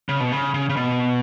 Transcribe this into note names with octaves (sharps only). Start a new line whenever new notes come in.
C#3
B2
C#3
C#3
C#3
B2